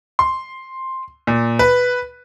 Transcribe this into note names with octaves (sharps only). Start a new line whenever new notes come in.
C6
A#2
B4